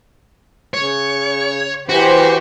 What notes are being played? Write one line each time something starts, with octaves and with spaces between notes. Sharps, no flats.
C#3 C#5
E3 F#4 G4 C5